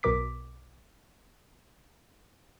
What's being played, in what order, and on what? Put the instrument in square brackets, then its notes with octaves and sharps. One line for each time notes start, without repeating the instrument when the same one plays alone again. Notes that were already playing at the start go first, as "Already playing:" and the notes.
[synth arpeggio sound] B1 B2 A#4 D6 B6